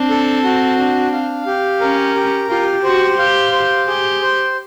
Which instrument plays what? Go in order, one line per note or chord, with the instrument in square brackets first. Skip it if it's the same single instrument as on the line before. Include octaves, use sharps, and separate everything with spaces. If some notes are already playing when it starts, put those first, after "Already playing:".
Already playing: [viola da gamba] C4 [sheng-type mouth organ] D4
[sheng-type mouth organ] A4
F#4
D4
F5
G4
[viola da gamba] C#4 [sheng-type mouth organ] A#4
[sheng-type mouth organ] G4
[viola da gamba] F4 [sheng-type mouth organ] G4
[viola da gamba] F#4 [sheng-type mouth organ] C5
[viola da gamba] G4 [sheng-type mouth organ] F5
[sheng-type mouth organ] C5
[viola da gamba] G4 [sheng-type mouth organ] G#4
[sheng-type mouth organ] C5